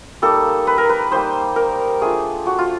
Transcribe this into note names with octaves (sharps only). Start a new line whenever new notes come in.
G3 A#3 D#4 A4
B4
A#4
B4
G3 A#3 D#4 C5
A#4
A3 D4 F4 G#4
F#4
F4